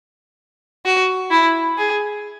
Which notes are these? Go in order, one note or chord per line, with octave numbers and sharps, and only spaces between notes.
F#4
E4
G#4